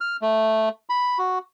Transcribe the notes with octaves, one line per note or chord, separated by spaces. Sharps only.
F6
A3
B5
F#4